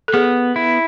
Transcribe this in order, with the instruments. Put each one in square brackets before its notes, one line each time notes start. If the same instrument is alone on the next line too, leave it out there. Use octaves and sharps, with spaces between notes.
[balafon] A4
[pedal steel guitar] B3 [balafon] G#4
[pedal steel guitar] E4